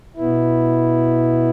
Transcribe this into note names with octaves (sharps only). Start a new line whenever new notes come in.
B2 B3 E4